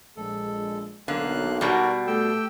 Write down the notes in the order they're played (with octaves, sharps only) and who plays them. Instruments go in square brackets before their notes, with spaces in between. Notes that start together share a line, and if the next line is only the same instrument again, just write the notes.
[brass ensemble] A#1 G#3 [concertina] A4
[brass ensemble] B1 [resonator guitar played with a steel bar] D3 [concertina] A#3 F5 F#6
[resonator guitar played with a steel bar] B2 G3 [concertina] F#4 A#4 D5
[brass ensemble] A3 A4 [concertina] G4 G5 E6